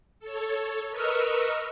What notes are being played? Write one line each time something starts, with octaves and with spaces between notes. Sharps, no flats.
A4 C#5
A#4 B4 D#5 C#6 E6 F6